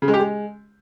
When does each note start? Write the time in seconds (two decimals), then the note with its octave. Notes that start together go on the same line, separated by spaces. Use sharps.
0.02 C#3
0.08 G#3
0.14 G4
0.19 G#3